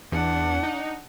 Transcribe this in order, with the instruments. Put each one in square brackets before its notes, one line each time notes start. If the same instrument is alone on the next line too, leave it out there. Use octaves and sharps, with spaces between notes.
[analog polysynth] E2 [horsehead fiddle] D4 F#5
[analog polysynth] D#4